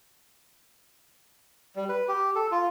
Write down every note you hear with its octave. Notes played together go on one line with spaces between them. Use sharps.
G3
B4
G4
A4
F4